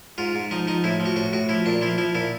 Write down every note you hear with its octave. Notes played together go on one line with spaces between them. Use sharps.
G#2 F4
G#2
F3 D#4
F3 D#4
A2 E4
F3
F#4
A2 F#4
A2 F#4
F3 E4
A#2 D4
F3 E4
F3 E4
A#2 E4